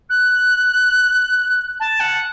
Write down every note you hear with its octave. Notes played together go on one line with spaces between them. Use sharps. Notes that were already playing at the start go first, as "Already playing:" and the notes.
F#6
A5
F#5